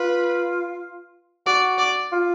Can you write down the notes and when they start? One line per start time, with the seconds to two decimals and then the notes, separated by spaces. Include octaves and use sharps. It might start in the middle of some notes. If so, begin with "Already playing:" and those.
Already playing: F4 B4
1.46 F#4 D5
1.78 D5
2.12 F4